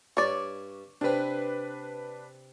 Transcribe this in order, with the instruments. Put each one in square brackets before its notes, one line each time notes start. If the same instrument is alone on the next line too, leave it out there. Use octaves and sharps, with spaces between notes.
[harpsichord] G2 C#6 [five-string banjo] C#5 D5
[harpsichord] C3 C4 [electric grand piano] D4 B4